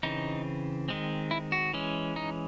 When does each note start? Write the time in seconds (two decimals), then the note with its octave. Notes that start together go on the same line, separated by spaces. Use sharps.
0.03 C#3 E3 C4 D#4
0.88 D#3 G#3 C4
1.31 E4
1.52 F#4
1.73 E3 G#3 C#4
2.16 D#4